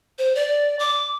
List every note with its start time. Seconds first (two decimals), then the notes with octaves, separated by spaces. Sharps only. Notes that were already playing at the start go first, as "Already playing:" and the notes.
0.19 C5
0.35 D5
0.79 D6